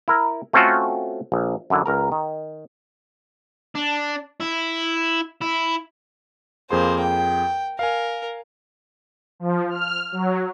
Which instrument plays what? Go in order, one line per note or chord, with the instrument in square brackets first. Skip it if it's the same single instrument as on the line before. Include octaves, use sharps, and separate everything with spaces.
[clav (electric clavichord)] E4 A#4
A3 C4 C#4 F4 F#4 A4
A#1
F#2 D3 E4
C#2 A#4 A#5
D#3
[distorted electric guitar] D4
E4
E4
[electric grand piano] F2 G#4 C6 [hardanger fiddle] A#3 C5
[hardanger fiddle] G5
[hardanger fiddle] A#4 [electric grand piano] F5 G#5
[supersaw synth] F3
F6
F#3